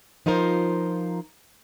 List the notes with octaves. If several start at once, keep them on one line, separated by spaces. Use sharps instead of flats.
F3 D#4 F4 A#4 C5